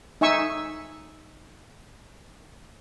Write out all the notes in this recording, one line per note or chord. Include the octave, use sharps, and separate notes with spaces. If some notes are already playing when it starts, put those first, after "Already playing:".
D#4 E5 G#5 C#6 E6